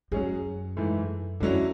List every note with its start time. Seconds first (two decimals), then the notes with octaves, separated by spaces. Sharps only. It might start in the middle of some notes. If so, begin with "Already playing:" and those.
0.12 F#2 F#3 C#4 G#4
0.77 G#2 E3 A3
1.40 E2 D3 F#3 C#4 E4